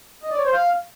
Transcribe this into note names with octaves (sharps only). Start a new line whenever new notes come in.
D#5
D5
C#5
C5
F5